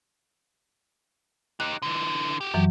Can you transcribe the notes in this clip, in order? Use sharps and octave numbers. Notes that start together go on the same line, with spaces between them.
D#4 G4 F#6
D3 E3
F#4 G4
F#2 E3 F#3